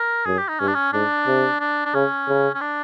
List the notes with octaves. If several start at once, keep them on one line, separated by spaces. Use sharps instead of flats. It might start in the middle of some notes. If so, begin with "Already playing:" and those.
Already playing: A#4
F#2 G#4
G4
D#4
G2 C#4
D4
C#4
G#2 D4
C3
D4
D4
C#3 C#4
C#3
C#4
D4